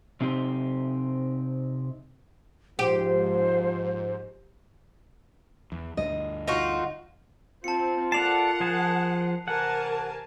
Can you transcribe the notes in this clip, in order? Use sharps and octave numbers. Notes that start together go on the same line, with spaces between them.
C3 C4 D#4 G4
G#2 F3 G4 C5
E2
D2 G2 D#5
D#4 F4 F#4
C4 F4 A5 C#7
A4 A#4 D5 F#5 A5 C7 F7
F3 G#4 A5
C3 E3 A#4 F#5 G#5 A5